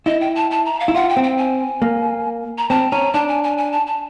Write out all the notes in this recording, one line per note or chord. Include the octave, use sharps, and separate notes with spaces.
E4 D#5
G5
A5
A5
A#5
F5
E4
F4 F#5
G5
C4
G5
G#5
A#3
A#5
C4 A5
C#4 A#5
D4 A5
G#5
G#5
G#5
A5
A5